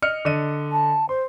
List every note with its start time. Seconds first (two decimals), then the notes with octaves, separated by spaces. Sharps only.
0.02 D#5 F6 C#7
0.25 D3 D#5 D#7
0.72 A5
1.09 C5 C6